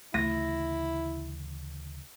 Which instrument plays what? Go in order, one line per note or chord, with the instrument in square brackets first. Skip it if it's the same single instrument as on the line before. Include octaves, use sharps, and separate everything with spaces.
[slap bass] D2 C#3 E3 [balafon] A3 [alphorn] E4 [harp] A#6